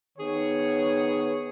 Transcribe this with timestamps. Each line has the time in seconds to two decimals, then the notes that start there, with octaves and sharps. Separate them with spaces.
0.18 D#3 B3 G#4 C#5